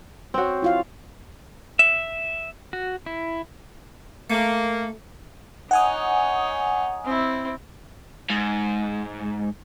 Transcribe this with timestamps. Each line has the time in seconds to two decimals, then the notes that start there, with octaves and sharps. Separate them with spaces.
0.34 C4 F#4 C5 C#5
0.62 E4 F4 F5
1.79 E5
2.73 F#4
3.06 E4
4.30 A3 A#3
5.71 D#4 C#5 F#5 G#5 D#6
7.05 C4 E4
8.30 G#2